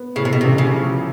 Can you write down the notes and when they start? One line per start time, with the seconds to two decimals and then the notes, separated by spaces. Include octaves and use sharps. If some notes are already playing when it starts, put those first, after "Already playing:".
Already playing: B3
0.16 A2 C#3
0.25 C3
0.33 B2
0.41 A1 C3
0.58 C#3
0.72 F3